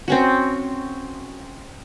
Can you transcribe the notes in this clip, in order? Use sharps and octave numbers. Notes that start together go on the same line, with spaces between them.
C4 C#4 F#4